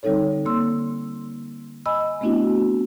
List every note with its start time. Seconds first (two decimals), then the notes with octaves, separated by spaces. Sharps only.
0.03 D3 G3 C4 D#4 A4 C#5
0.45 D3 A#3 C6 E6
1.86 D#5 G#5 B5 E6
2.21 A3 B3 C4 D4 E4 F#4